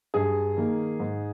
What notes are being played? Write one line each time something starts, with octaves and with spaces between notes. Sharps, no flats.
G2 G#4
D#3 A#3
G#2